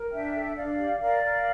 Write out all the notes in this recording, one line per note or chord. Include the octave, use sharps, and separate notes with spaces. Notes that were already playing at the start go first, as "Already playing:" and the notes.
Already playing: A#4
D4 E5 G5
A4
D4 D5 F5
G4
A#4 D5 F5
A#4